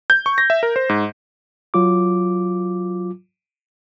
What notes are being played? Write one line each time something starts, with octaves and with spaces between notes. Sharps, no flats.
G6
C#6
A#6
E5
A#4
C5
G#2
F#3 F4 D6